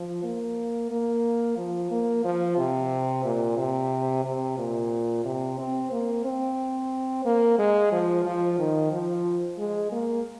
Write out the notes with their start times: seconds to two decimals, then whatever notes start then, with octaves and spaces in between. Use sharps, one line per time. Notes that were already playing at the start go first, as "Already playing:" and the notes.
Already playing: F3
0.24 A#3
0.91 A#3
1.58 F3
1.91 A#3
2.25 F3
2.58 C3
3.25 A#2
3.58 C3
4.25 C3
4.58 A#2
5.25 C3
5.59 C4
5.92 A#3
6.25 C4
7.25 A#3
7.59 G#3
7.92 F3
8.25 F3
8.59 D#3
8.92 F3
9.59 G#3
9.92 A#3